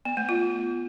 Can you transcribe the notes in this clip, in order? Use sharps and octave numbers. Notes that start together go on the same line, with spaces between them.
B3
A3
F4